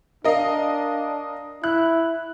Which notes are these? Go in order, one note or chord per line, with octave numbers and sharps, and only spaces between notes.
D4 A#4 D#5 F5
E4 F#6